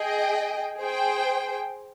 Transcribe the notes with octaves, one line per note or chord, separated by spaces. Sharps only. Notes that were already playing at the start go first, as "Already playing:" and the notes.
Already playing: G#4 D#5 G5
G#4 C5 G5